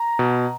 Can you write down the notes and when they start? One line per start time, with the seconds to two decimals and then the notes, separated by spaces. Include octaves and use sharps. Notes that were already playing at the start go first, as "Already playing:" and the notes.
Already playing: A#5
0.19 B2